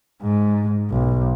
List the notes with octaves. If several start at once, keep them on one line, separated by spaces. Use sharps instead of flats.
G#2
B1